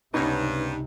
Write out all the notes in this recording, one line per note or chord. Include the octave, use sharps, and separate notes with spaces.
C#2 G2 C3 B3 C#4 D#4 A#5